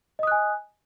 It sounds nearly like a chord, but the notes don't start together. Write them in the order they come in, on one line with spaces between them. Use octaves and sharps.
D#5 D#6 F#6 G#5